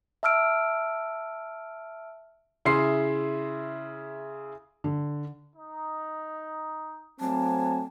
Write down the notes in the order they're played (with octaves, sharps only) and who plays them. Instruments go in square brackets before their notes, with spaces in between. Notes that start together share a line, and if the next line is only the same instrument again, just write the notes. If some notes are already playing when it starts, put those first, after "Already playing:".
[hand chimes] E5 A5 E6 F6 D7
[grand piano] C#3 E4 G#4 E5 C6 C7
[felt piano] D3
[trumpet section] D#4
[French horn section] F#3 A3 C4 [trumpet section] A#3 G#5 [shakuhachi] A5